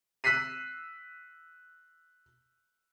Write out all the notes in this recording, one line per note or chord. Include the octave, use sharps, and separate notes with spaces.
E6 F#6 B6 C7 D#7